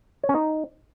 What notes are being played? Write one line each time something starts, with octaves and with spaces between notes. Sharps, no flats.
C#5
C#4
D#4